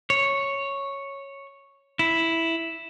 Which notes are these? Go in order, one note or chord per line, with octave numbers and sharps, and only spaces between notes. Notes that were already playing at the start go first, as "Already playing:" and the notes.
C#5
E4